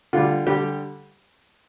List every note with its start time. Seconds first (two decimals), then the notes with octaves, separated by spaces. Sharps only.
0.13 D3 G3 F4
0.46 D3 G3 G4